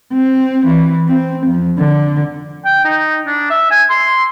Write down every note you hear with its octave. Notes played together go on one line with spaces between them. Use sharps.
C4
E3
C4
F2
D3
G5
D#4
D4
E5
G#5
C6